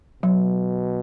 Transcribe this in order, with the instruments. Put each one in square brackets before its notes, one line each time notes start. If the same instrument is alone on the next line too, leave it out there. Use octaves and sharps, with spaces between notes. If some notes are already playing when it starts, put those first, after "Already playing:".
[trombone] B2 [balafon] F#3